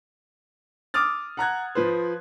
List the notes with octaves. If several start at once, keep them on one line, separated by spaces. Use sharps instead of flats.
D6 D#6 F6 A6
F#5 A#5 F#6 G#6
F3 B4 C5